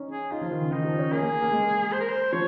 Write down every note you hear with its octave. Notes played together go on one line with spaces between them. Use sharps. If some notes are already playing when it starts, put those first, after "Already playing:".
Already playing: C#4 D#4
G#4
D#4 F4
F3
D#3
C#3
D#3 D#4
F3
C#4
A#3 G#4
A#3
A#3
G#3
C5
A#4
C5
F3 C#5